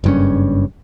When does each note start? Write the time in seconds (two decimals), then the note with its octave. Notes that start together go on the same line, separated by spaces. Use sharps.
0.04 F#1 G2 C#4